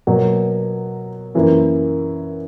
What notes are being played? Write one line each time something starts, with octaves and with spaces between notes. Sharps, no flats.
B2 F#3 A#3
F#2 E3 A#3